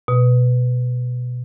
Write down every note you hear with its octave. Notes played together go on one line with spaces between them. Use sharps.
B2